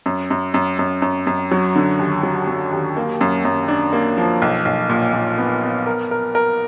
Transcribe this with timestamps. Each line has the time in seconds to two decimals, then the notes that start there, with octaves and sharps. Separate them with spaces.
0.06 F#2
0.30 F#2
0.54 F#2
0.79 F#2
1.02 F#2
1.27 F#2
1.51 F#3
1.76 D3
1.99 D#2
2.23 F#3
2.47 F#3
2.72 D#2
2.97 A#3
3.21 F#2
3.45 F#2
3.68 D4
3.93 A#3
4.18 F3
4.42 B1
4.65 B1
4.89 A#2
5.13 A#2
5.38 B3
5.63 B3
5.86 A#4
6.11 A#4
6.35 A#4